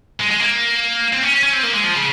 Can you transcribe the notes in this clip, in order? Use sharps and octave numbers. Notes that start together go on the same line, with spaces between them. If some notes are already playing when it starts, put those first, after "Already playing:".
G#3
G#3
A#3
C4
C#4
C#4
C4
A#3
G#3
F3
C#3